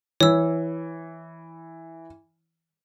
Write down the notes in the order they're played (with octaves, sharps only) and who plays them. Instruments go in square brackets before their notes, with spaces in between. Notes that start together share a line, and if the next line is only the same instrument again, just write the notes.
[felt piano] E3 [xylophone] C#5 E6